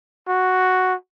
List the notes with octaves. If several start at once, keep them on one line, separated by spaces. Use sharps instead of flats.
F#4